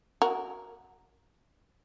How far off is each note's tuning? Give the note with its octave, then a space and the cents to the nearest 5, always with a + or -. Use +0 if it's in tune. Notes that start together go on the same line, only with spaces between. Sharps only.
F#4 +0 A#4 +0